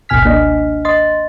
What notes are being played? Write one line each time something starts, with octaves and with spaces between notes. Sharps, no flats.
G1 C#2 B2 G#5 F6 B6
A#3 D4 D#5
D#5 C6 A6